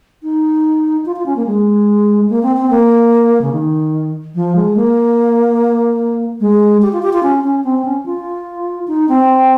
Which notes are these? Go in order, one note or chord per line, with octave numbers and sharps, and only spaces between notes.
D#4
F4
F4
C#4
A#3
G#3
A#3
C4
C4
A#3
C#3
D#3
F3
G#3
A#3
G#3
G4
F4
G4
F4
C#4
C#4
C4
C#4
F4
D#4
C4